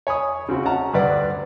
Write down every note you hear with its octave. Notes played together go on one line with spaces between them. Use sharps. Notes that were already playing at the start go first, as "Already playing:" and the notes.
C#5 G#5 B5 D#6
C#3 C4 F#4
C#4 F#5 A5 A#5
D2 G2 B4 D5 F#5